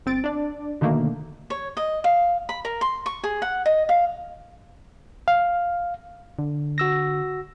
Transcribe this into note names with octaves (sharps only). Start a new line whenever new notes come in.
G1 C4 A6 D7
D4 D5
B2 D3 D#3 A3 A#3
C#5
D#5
F5
B5
A#4
C6
C#6
G#4
F#5
D#5
F5
F5
D3
F#4 E6 A#6